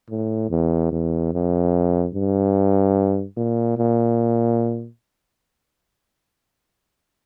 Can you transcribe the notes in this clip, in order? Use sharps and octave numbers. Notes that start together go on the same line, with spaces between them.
A2
E2
E2
F2
G2
A#2
A#2